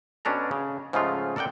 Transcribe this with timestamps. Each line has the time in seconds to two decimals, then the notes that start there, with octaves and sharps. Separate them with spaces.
0.25 B2 C#4 D4 A4 A#5
0.51 C#3
0.93 G#2 C#3 F3 G#3 A3 F4
1.36 A4 A#4 D5 F#5 G5